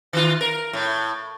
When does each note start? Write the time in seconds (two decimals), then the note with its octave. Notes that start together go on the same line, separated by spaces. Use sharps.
0.13 D#3 F4
0.41 A#4
0.73 A2